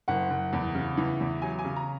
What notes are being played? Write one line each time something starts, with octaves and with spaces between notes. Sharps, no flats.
F#1 F#5
F#1
E2
C#3
E3
E2
F#3 G#5
G#5
C#3
A#5